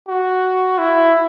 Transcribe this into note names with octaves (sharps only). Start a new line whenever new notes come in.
F#4
E4